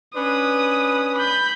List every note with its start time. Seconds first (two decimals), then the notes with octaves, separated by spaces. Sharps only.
0.16 C#4 D4 B4 D#6
1.18 B5 G6